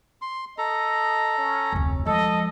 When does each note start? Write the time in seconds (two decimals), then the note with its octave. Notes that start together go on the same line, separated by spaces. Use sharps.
0.22 C6
0.58 A4 D#5 A#5
1.38 C#4
1.72 F1 D2
2.06 F3 G#3 A4 D#5